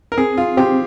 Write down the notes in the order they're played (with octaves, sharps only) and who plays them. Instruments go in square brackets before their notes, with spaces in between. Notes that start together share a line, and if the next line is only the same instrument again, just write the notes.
[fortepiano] A#4
[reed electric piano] C4 [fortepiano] G#4
[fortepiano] F4
[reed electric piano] C4 [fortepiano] G4